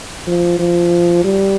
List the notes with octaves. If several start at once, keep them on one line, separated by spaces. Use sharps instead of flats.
F3
F3
G3